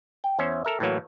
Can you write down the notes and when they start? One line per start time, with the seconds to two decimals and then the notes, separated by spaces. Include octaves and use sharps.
0.24 G5
0.39 E2 C#4 C5 E5
0.65 A4 A#4 E5
0.80 A2 E3 F#3 A#3